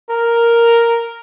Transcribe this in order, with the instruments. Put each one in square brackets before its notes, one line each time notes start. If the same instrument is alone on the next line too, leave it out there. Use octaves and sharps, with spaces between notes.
[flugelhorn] A#4